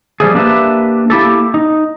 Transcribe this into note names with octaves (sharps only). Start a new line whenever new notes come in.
F3 G3 A3 G#4
A#3 D4 G4 A#4 B4 E5
A#3 E4 G4 A4
D#4